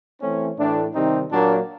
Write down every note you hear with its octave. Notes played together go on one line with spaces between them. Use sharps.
E3 A3 C4 C#4
A2 E3 A3 D4
C3 D#3 G3 C4 D#4
A#2 F#3 A#3 D4